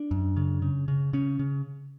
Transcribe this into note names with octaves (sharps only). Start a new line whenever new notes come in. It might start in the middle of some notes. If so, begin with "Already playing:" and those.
Already playing: D4
F#2
C#3
C#3
C#3
C#3 C#4
C#3